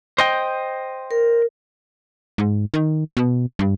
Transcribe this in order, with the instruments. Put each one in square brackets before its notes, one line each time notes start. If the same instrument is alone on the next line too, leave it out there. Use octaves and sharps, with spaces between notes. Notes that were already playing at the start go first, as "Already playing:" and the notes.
[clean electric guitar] C5 D#5 G5
[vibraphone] A#4
[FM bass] G#2
D#3
B2
G2